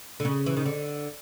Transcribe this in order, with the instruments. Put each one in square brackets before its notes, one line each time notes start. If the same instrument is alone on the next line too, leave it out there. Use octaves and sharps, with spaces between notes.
[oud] D3
C#3
E3
D#3
D3